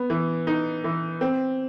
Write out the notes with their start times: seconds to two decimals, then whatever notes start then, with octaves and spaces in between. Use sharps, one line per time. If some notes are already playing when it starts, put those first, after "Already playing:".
Already playing: B3
0.10 E3
0.47 D#4
0.84 E3
1.21 C4